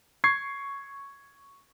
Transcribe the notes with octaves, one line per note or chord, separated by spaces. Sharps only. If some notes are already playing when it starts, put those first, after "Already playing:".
C#6 G#6 C7